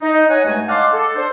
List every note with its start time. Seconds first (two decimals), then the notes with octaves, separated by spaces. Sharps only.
0.02 D#4
0.30 C#5 F#5 G#5
0.45 G2 G#3 A3 F#4 G#5
0.68 D#5 F5 F#5 A5 C6 D6
0.93 A4
1.16 D4 C5